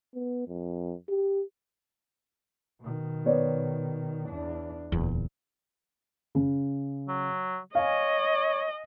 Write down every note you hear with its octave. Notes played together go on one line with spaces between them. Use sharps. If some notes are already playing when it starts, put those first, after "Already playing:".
B3
F2
G4
B2 D#3
B3 C#5 D5
E2 D4
D1 E2 A#2
C#3
F#3
C#5 D#5 F5 G#5